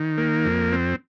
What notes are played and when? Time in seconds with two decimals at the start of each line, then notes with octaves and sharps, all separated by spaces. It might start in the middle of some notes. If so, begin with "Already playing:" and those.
Already playing: D#3
0.18 A#3
0.45 F2
0.72 C4